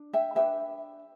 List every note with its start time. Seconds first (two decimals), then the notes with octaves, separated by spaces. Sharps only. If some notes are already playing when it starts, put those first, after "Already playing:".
Already playing: D4
0.13 E5 G5
0.35 G4 B4 E5 G5
0.40 D4